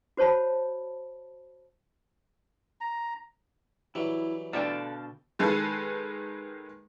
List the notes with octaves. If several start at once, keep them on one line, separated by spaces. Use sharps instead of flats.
F#4 C5 C#5 A5 B5
A#5
E3 F#3 G3 E4
B2 D3 A3 D4 A4 F5 G5 A5
D#3 G#3 G#4 A4 B4